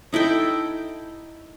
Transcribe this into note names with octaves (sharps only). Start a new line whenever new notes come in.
D#4 E4 A4 G5